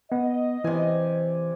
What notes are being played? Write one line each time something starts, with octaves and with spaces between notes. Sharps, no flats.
B3 D#5
C3 E3 D5 G#5